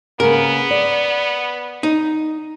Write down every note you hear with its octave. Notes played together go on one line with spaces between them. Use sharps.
C#3 A#3 B3 A#4
D5
D#4